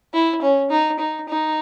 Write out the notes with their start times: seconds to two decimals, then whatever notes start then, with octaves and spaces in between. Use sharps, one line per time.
0.14 E4
0.42 C#4
0.70 D#4
0.99 D#4
1.29 D#4